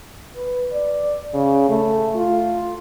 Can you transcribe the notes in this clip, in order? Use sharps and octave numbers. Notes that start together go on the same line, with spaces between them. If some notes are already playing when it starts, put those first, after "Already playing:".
B4
D5
C#3
A3
F4